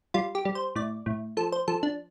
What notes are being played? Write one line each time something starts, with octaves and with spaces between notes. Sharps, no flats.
G3 F4
G4
G3
C5
A2 D5
A2
F3 A4
C5
F3 A4
D4